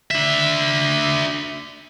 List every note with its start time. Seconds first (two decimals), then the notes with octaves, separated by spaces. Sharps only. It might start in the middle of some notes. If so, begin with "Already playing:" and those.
0.11 D4 E5